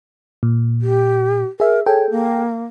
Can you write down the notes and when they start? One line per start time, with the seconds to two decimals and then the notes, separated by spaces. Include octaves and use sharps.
0.43 A#2
0.81 G4
1.60 G#4 A#4 E5
1.86 G#4 A4 C#5 G5
2.10 A#3